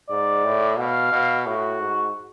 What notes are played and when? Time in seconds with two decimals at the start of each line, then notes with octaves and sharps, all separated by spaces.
0.10 G#2 D5
0.45 A2
0.78 B2 F5
1.12 B2
1.46 A2 F#4
1.80 G#2